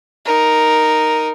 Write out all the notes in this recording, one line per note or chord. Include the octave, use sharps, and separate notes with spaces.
D#4 A#4